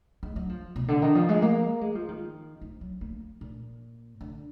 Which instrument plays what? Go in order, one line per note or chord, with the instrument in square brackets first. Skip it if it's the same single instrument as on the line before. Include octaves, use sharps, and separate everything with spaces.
[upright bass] G#3
F#3
F3
B2
D3
D#3
F3
G#3
A#3
G#3
F3
D#3
F3
F#3
A#3
A#2
D3